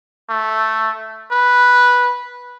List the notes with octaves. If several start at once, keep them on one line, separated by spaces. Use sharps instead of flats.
A3
B4